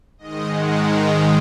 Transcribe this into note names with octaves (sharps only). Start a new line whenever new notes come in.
G#2 D#3 G#3 D#5
F#5
A#5